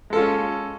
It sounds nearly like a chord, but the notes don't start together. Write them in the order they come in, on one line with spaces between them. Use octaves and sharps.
G#3 A4 F4 C#4